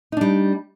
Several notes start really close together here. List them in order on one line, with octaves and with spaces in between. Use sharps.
D#4 D4 G3